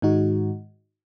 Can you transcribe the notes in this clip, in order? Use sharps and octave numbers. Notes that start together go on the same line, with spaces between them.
G#2 D#3 G#3 D#4 F#4